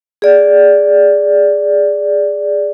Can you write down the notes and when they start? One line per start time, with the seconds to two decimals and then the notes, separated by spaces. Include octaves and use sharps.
0.22 G#4 D5